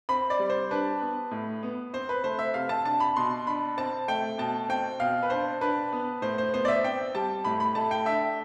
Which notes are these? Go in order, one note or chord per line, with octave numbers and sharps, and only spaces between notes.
C4 B5
D5
G3
C5
D4 B4
B3
A2
B3
C4 C5
B4
A3 C5
E5
C3 F5
A5
D4 A5
B5
B2 C6
D4 B5
C4 A5
A3 G5
B2 A5
C4 G5
B2 F5
B4
D4 C5
D4 B4
B3
A2 C5
C5
B3 C5
D5
E5
C4 G5
G3 A5
A2 B5
B5
A3 A5
G5
D4 E5